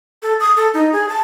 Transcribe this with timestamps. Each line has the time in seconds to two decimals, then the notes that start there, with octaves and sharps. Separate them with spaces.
0.23 A4
0.40 D#6
0.57 A4
0.74 D#4
0.93 G#4
1.09 A5